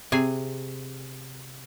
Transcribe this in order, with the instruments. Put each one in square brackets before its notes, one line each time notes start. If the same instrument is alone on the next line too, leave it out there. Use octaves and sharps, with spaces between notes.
[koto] C3 G#4 G#5